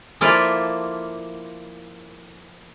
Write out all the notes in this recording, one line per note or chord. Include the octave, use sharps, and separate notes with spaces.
F3 A#3 E4 F4 A4 D5